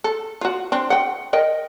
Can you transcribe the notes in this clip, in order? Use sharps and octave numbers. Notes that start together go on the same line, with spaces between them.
A4
F4 F#4
C4 D4
F#5 G5
A#4 D#5 G5